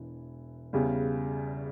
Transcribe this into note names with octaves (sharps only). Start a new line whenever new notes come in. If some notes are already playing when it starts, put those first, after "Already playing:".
Already playing: E1 E3
E2 C#3 G3